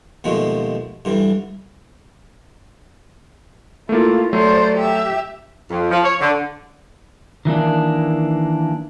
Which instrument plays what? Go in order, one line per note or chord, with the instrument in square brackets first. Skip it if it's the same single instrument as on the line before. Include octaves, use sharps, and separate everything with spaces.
[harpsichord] D#2 B2 F3 G#3 A3
G2 D3 E3
[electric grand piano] A3 A#3 [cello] E4 F4
[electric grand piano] F#3 A3 [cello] C5 D5
[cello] G4 E5
[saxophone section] F2
F3
C#5
D3
[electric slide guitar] D#3 E3 A#3 D4